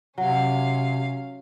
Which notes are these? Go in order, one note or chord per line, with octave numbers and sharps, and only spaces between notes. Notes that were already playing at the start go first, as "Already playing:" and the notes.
C3 F#3 C#4 F5